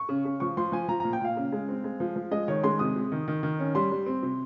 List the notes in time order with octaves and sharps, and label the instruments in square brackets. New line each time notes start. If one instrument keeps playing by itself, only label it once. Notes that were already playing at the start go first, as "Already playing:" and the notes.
Already playing: [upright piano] C#6
C#3
C#3
F3 C#6
F3 C6
F3 G#5
F3 A#5
A#2 A#5
G5
A#2 F5
C#3
G#3
C4
G#3
F3
F3
G#3 D#5
D#3 C#5
G#3 C6
C3 D#6
C3
D#3
D#3
D#3
C#4
G3 C6
G3
C4
C3